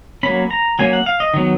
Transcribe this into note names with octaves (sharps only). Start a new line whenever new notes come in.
F#3 A#3 C#4 B5
A#5
F#3 A#3 C#4 G#5
F#5
F5
D#5
D#3 F#3 B3